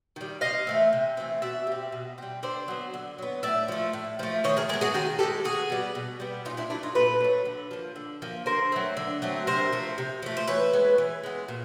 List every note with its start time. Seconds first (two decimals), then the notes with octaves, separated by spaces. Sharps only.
0.16 D#3 G3
0.41 C3 D#5 F5
0.67 E3 A3 C4
0.93 C3
1.17 E3 A3 C4
1.42 B2 D5 E5
1.67 G3 C4
1.92 B2
2.18 G3 C4
2.43 D3 C5 D5
2.68 F#3 B3
2.94 D3
3.18 F#3 B3
3.43 A2 D5 E5
3.68 F3 A3
3.93 A2
4.19 F3 A3
4.44 D#3 C#5 D#5
4.57 G#4 A#4
4.69 G#3 G#4 A#4
4.73 B3
4.81 F#4 G#4
4.94 D#3 F#4 G#4
5.19 B3 G4 A4
5.23 G#3
5.44 B2 F#4 G#4
5.70 G3 B3
5.95 B2
6.20 G3 B3
6.45 A#2 D#4 F4
6.57 D4 E4
6.70 F#3 A3 D4 E4
6.83 D#4 F4
6.95 A#2 A4 B4
7.20 F#3 A3
7.45 D3
7.71 F3 A#3
7.96 D3
8.22 F3 A#3
8.46 D3 A#4 C5
8.72 F#3 A3 C4
8.97 D3
9.22 F#3 A3 C4
9.47 C3 A#4 C5
9.73 F3 A3
9.98 C3
10.23 F3 A3
10.37 C5
10.48 E3 B4 C#5
10.73 G#3 B3
10.98 E3
11.24 G#3 B3
11.48 A#2